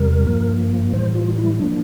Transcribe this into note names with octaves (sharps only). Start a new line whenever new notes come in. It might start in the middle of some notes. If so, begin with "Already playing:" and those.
Already playing: E2 C3 G3 A#4
G2 F3 A#3
A2 E3 G3 C5
F4
E4
F3 A#3 D4